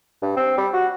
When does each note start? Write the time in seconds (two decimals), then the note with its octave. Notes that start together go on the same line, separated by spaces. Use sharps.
0.22 G2
0.37 C4
0.57 G3
0.73 F#4